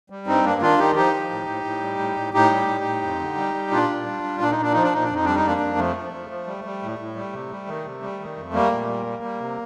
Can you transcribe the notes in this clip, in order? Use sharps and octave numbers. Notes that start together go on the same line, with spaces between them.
G3
G2 C4 D#4
G2 A#3 D4
D#3 D4 F4
D#3 D#4 G4
F3 D#4 G4
F3
A2
A2
A2
G3
A2
A2
A2 D#4 G4
G3
A2
A2
F2
D3
G3
G3
A#2 D4 F4
A#2
G3
G3
A#2 D4
D#4
A#2 D4
F3 D#4
D4
A#2 D#4
D4
F2
D#4
G3 D4
D#4
F2 A#3 D4
F2
F3 A3
F3
F3
F3
G3
G3
A2
A2
G3
C3
G3
D#3
C3
G3
D#3
F2
G3 A#3
A#2
G3
G3
G3
C3